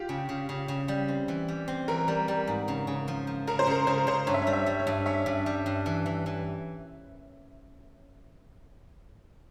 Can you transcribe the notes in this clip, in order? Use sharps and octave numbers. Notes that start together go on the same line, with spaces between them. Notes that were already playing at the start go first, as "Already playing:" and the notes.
Already playing: F4 G4
C#3
C#3
C#3
C#3
G3
C4
E3
G3
C4
E3 A#4
G3
G3
G#2
C#3
C#3
F3
F3
C#3 A#4
C5
C#3 A#4
C#3 C5
A#4
C#3 C5
G2 C#5
E5
C#5
G3
E5
G3
C#5
G2
C#4 E5
G2
G3
G2
E3
E3
E3